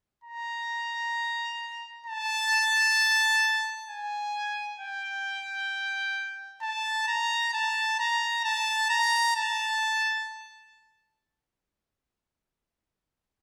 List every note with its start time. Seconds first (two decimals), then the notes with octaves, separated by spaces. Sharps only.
0.24 A#5
2.06 A5
3.89 G#5
4.80 G5
6.62 A5
7.08 A#5
7.54 A5
7.99 A#5
8.45 A5
8.90 A#5
9.36 A5